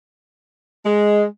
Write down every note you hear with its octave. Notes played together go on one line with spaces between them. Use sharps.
G#3